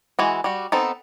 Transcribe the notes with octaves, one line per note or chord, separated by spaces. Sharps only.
E3 G#3 F#4
G3 F#4
B3 C4 D#4 A4